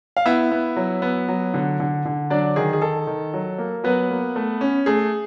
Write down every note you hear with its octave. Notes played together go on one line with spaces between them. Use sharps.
F5
B3 E4 E5
B3
F#3
B3
F#3
D3
D3
D3
F#3 D4 D5
D#3 G#4
G#4
D#3 A4
D#3
F#3
A#3
F#3 B3 B4
A#3
A3
C#4
A3 G#4